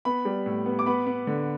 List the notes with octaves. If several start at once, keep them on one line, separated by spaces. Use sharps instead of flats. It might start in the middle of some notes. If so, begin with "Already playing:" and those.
B3 B5
G3
A2
B3
D6
B3 B5
B3
D3